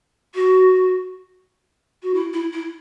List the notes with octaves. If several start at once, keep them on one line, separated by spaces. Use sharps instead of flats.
F#4
F#4
E4
E4
E4